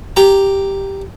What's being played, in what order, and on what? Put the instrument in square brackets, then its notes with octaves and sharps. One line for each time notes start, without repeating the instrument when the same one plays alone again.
[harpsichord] G4 A#5